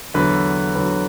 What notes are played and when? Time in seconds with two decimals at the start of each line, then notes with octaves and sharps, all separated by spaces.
0.14 E2 D3 F#3 B4
0.75 E2 D3 F#3